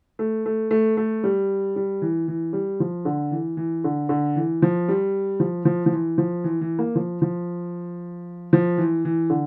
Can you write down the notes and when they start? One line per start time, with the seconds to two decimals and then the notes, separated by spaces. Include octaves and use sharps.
0.19 A3
0.46 A3
0.71 A3
0.97 A3
1.24 G3
1.76 G3
2.02 E3
2.28 E3
2.53 G3
2.80 F3
3.05 D3
3.31 E3
3.57 E3
3.84 D3
4.09 D3
4.36 E3
4.62 F3
4.88 G3
5.40 F3
5.65 F3
5.86 F3
5.92 E3
6.18 F3
6.44 E3
6.61 E3
6.79 A#3
6.96 F3
7.22 F3
8.53 F3
8.78 E3
9.05 E3
9.30 D3